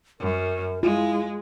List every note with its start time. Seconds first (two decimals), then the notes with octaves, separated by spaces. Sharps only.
0.20 F#2 A#4
0.83 G#3 E4 F4